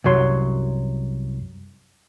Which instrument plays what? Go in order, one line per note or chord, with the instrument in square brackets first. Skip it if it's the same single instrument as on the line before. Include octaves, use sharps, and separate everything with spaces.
[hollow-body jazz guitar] C2 F#2 F#3 C6